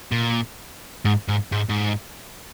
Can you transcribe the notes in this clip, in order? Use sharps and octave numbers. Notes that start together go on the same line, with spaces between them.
A#2
G#2
G#2
G#2
G#2